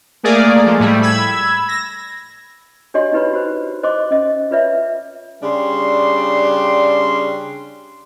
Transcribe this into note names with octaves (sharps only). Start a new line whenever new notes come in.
A3 A#3 G#4 A#4 D5
F3 G#3
A2 G3 A3
B5 E6 G#6
A#6
D4 F#4 G4 C#5 D#5 C6
D#4 E4 G4 B4 C#5 B5
F#4 C5
C5 D#5 C6 D6
C#4 D#5
F4 B4 C#5 E5
C#3 G3 D4 C6